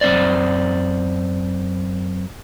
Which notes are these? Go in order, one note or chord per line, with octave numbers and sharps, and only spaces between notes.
F#2 C4 C5 D5